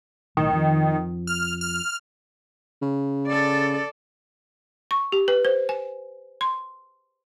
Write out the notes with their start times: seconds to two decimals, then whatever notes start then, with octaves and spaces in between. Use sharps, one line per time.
0.37 B1 A2 D#3
0.52 F2 F3
1.27 F6
1.61 F6
2.82 C#3
3.27 A4 D5
4.91 C#6
5.12 G4
5.28 B4
5.45 C5
5.69 G#5
6.41 C6